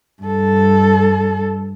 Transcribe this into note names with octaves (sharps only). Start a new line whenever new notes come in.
G2 A4